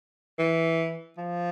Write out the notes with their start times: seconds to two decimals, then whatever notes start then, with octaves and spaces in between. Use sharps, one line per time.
0.39 E3
1.17 F3